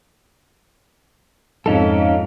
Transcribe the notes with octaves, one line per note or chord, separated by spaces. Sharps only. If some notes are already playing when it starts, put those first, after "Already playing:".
F2 G#2 C#4 D#4 A4 F5